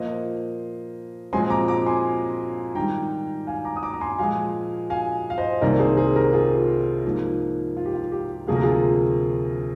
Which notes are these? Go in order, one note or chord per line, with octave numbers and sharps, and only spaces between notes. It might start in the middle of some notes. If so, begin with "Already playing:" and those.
Already playing: A#2 F3 A#3 C5 D#5
A#2 F3 G#3 C4 G#5 C6
A#5 D6
A#5 D6
G#5 C6
G#2 D#3 G3 G5 A#5
F5 G#5
A#5 D6
D#6
A#5 D6
A#5
G#5 C6
A#2 F3 G#3 F5 G#5
F5 G#5
F5
C5 D#5
C2 C3 D#3 A#3 A#4 D5
G#4 C5
G#4 C5
G4 A#4
F4 G#4
G#2 F3 A#3
F4
G4
F4
G4
D2 C3 F3 A#3 G#4
A#4
F4 G#4